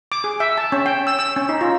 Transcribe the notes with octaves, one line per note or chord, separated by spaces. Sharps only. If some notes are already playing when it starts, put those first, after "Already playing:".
D6
G#4
E5
A5
C#4
G5
E6
E6
C#4
D#4
F4